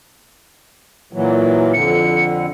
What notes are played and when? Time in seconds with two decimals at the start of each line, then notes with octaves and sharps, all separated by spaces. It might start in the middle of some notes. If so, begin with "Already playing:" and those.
1.13 A#2 E3 F#3
1.74 F2 D3 C#7